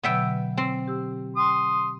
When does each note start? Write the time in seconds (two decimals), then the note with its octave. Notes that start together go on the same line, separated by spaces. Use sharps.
0.03 B2 D3 F#3 B3 E5 G5
0.57 C4
0.88 G4 E6
1.37 G5 C6 D#6